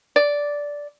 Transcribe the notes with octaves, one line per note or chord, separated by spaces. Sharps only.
D5